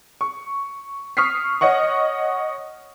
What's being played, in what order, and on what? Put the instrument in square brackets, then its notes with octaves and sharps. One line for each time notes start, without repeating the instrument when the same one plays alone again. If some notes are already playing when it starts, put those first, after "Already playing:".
[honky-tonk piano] C#6
C#6 D#6 F6 B6 C7
C#5 D#5 F#5 C#6